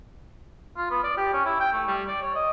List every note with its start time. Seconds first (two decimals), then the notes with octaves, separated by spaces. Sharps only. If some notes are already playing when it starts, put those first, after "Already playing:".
0.77 F4
0.91 B3
1.04 D5
1.17 G4
1.33 C#4
1.45 E4
1.60 G5
1.73 A3
1.88 G3
2.08 D5
2.22 C#5
2.35 D#5